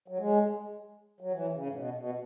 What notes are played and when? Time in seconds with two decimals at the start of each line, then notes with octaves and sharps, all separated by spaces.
0.08 F#3
0.19 G#3
1.21 F#3
1.32 E3
1.53 C#3
1.66 G#2
1.75 B2
1.96 B2